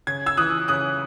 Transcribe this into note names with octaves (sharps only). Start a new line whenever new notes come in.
C#3 G#6
E6 G#6
E3 D#6 F#6
C#3 D#6 F#6